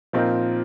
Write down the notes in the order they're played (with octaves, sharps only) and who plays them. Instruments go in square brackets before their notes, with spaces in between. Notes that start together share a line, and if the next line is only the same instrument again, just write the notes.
[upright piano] A#2 F3 C4 D#4 A#4